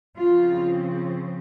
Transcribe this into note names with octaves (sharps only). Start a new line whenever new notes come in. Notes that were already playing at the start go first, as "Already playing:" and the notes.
C#3 F3 C4 F4